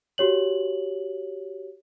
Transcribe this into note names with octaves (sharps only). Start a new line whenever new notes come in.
F#4 G4 C#5 F#7